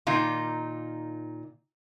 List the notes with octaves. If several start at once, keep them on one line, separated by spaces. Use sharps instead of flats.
A#2 D#3 D#4 F4